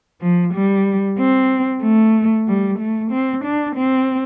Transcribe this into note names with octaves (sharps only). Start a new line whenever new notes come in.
F3
G3
C4
A3
G3
A3
C4
D4
C4